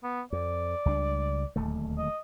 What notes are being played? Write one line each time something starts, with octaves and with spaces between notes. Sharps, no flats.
B3
F2 D5
C#2 G3 D4
D1 D#2 A3
D#5